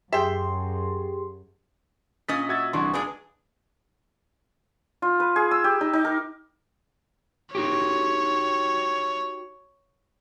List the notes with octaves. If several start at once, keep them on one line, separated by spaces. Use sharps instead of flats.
F#2 G4 G#4 E5 G5 C6
A#2 C#4 D#5 D#6 A6 B6
F#4 E5 G#6 A6
C2 E3 D4 F#4 C6
A#2 G#3 D4 G#4 B4
F4
B4
G#4
E6
G4
D#4
D#4
A#4
D#4 F#4 G4 C#5